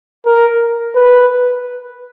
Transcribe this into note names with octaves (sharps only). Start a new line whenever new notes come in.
A#4
B4